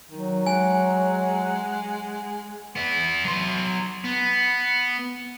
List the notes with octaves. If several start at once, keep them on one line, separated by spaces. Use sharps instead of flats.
D#3 F#3
G#3 F#5 G#5
B3 E4
F#3 C6
B3